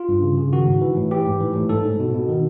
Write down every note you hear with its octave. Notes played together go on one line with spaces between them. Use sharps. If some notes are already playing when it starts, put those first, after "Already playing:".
Already playing: F4
G2
C#3
C#3
D#3 F#4
G#2
E3
A2
E3 G4
G#2
E3
A2
G#2 A4
G#2
B2
B2
D#3